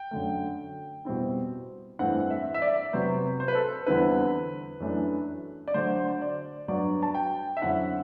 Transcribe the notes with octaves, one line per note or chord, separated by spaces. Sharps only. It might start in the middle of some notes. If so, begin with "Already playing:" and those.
Already playing: G5
F#2 D3 A3
B2 G3 C4 E4
G2 E3 A3 C4 E4 F#5
E5
E5
D5
C3 F#3 B3 C5
C5
B4
A4
E2 D3 G3 C4 E4 B4
F#2 E3 A3 D4
D5
D3 F#3 A3 C5
D5
G2 F#3 B3 D4 D5
A5
G5
E5
F#2 D3 F#3 C4 E4 F#5